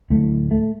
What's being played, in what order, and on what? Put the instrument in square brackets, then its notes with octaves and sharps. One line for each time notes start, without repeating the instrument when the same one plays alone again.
[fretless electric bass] D1 A2 A3
A3